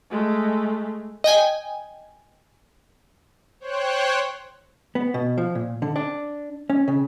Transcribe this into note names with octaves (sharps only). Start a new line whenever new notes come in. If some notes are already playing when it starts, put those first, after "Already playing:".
G#3 A3
D#5 G5 G#5
C5 C#5 G5 F#6
B3
B2
F3
A#2
D3
D4
C#4
C#3